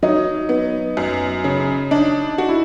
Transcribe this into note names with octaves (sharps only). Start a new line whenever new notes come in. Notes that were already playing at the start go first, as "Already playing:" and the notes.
F#3 D#4
B3
F#2
C#3
D4 D#4
F#4
E4